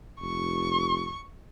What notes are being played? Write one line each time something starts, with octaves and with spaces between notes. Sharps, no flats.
F1 C#6